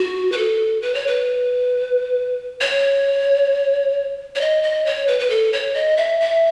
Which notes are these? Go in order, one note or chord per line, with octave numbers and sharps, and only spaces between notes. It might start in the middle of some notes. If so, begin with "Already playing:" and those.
Already playing: F#4
B4
A4
B4
C#5
B4
C#5
C#5
D#5
D#5
C#5
B4
B4
A4
C#5
D#5
E5
E5